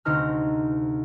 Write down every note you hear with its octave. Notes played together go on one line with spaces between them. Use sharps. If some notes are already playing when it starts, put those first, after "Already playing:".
D2 C3 D#4 C5 A#5 F6